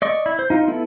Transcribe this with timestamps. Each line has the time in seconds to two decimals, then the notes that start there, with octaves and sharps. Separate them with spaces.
0.02 D5 D#5 C#6
0.26 E4
0.39 C5
0.50 D#4 F4
0.68 B3 E4 A4